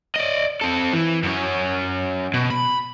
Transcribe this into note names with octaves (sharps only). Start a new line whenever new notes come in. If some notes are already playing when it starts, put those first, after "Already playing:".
D5 D#5
C4 A4
E3
F#2 C#4
B2
B5